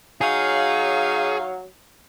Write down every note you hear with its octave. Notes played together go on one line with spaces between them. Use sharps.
F#3 D#4 G#4 C#5 F5